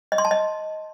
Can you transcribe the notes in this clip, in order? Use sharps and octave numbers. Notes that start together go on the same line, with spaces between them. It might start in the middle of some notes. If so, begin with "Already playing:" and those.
D#5
C6
A5
D#5